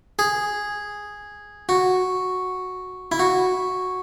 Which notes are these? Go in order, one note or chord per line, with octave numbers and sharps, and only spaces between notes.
G#4
F#4
E4
F#4